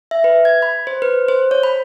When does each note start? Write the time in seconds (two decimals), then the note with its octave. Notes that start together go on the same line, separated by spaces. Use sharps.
0.11 E5
0.24 B4
0.45 G#6
0.62 B5
0.87 C5
1.02 B4
1.28 C5
1.51 C#5
1.63 B5